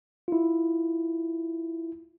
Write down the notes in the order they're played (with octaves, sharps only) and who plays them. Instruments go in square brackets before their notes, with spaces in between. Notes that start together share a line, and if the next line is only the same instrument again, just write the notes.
[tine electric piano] E4 F4